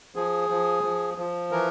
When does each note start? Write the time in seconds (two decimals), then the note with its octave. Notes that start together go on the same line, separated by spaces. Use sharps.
0.15 F3 G#4
0.50 F3
0.84 F3
1.18 F3
1.51 E3 A#4